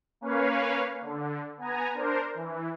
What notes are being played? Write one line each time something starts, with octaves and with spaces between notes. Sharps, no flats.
A#3 C#4 B4 C#5 F5
D3
B3 G#5 A#5
D4 A#4 C5
E3